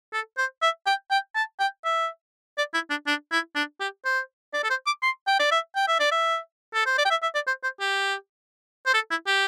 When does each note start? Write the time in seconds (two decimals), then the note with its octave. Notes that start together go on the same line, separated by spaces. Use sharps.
0.13 A4
0.38 C5
0.62 E5
0.86 G5
1.11 G5
1.35 A5
1.59 G5
1.85 E5
2.58 D5
2.74 E4
2.90 D4
3.07 D4
3.32 E4
3.55 D4
3.80 G4
4.05 C5
4.53 D5
4.64 A4
4.70 C5
4.86 D6
5.03 C6
5.27 G5
5.39 D5
5.51 E5
5.76 G5
5.88 E5
6.00 D5
6.11 E5
6.74 A4
6.86 C5
6.98 D5
7.05 G5
7.10 E5
7.23 E5
7.35 D5
7.47 C5
7.63 C5
7.80 G4
8.86 C5
8.94 A4
9.11 E4
9.27 G4